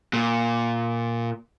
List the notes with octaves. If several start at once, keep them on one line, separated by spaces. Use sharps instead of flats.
A#2